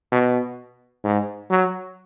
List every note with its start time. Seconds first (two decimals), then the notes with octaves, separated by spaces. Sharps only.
0.12 B2
1.04 G#2
1.50 F#3